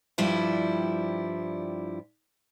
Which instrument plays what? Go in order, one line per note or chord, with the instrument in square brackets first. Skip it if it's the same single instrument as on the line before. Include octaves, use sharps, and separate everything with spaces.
[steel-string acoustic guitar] G2 F3 G3 E4